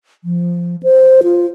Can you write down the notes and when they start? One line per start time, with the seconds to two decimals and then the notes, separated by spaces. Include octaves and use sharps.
0.24 F3
0.83 C5
1.23 F4